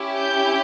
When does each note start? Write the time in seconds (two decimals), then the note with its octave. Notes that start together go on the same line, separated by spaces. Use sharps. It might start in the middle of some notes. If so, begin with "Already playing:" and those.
Already playing: C#4 E4 G4
0.18 G6